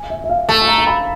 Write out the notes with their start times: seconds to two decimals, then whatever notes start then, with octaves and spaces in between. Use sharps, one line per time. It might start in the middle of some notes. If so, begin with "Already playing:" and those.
Already playing: G#5
0.10 E5
0.24 E5
0.29 F5
0.48 A3 A5
0.62 A5
0.68 A#5
0.78 A#5
0.87 B5